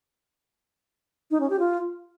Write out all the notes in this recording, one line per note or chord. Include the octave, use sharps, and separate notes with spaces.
D#4
C#4
G4
F4